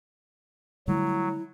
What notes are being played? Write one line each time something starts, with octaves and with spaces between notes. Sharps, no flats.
D3 F#3 G3 A3 E4